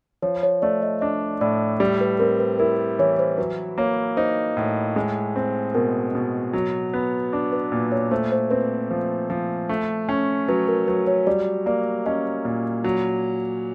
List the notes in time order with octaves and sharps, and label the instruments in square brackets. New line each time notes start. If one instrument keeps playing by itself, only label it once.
[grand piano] F3 [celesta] C#5
[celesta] C#5
[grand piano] A3 [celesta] D5
[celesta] D#5
[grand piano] D4 [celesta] D#5
[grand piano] A2 [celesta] D5
[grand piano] G3 [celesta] D5
[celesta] B4
[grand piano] C4 [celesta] A#4
[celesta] B4
[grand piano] E4 [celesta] A#4
[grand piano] E3 [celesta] C#5
[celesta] C5
[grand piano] F#3 [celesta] B4
[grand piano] A#3 [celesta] C#5
[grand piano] D#4 [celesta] C5
[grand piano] A2
G#3
C4
[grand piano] B2 [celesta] A#4
[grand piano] B2
F#3
B3
D4
[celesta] B4
[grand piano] A#2
[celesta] C#5
[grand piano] A3 [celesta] C5
[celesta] C5
[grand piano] C4 [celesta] B4
[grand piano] F3
F3
A3
C#4
[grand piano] F#3 [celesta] B4
[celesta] A#4
[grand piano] F#3 [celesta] B4
[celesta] C#5
[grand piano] G3 [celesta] D5
[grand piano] A#3 [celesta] D5
[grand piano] C#4 [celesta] D#5
[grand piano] A#2
F#3